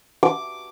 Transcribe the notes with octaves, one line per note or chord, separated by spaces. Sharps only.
D6